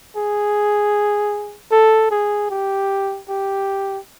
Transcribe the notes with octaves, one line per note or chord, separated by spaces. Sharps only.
G#4
A4
G#4
G4
G4